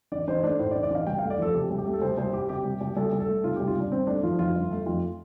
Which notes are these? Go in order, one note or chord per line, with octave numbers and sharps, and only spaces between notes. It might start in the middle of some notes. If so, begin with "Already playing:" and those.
A1 D5
A1 C5
A3 D4
A2 C5
D5
A1
D5
A1 F5
C2 G5
A3 F5
D5
F3 A4
C3 G4
C2
G4
A3
A4
C2 C5
C2 C5
G3 G4
C3 G4
C2
C2
C2 A4
C2
A4
A3
C3 F4
C2 G4
F4
C2 D4
G1 C4
A3 D4
F3 F4
F2 F4
G1
A3
F2 F4